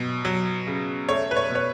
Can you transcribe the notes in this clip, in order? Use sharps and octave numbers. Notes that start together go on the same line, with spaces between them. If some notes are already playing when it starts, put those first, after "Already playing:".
Already playing: B2 F#3
F#3
C#3
A3 C#5
B4
C#5
B2
C#5